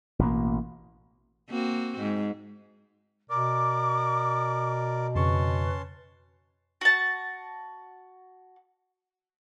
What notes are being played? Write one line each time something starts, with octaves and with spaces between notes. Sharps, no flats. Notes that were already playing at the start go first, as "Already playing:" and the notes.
A1 B2 A#3
A#3 C4 F#4
G#2
B2 A#4 D5 D6
F2 C#3 C#4 B4 A5 C6 C#6
F#4 A5